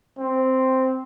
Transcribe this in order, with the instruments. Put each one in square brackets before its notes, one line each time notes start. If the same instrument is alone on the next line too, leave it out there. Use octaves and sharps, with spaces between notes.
[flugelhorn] C4